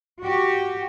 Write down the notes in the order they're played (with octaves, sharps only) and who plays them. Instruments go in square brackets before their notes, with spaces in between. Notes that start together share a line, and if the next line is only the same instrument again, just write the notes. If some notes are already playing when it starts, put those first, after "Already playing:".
[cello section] F#4 G4